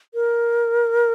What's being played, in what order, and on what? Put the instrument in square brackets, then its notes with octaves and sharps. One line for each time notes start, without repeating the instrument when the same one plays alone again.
[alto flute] A#4